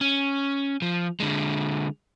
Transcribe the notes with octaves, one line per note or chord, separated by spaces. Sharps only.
C#4
F3
D3 G#3